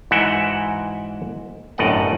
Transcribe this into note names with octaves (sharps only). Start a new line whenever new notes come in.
G#2 E3 F#4 E5 F#5 G5
G1 F#2 A2 D5 D#5 F#5